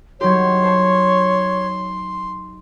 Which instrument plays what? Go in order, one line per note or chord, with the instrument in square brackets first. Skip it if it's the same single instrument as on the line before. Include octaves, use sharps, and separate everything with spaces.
[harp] F#3 D#4 G4 [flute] C#5 [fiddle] C6
[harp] C5 A5